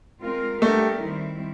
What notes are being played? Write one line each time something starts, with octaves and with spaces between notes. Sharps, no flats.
G#3 C4 F4 A#4
G3 A3 B3 D4 G4 A#4
D#3 G3 C4 E4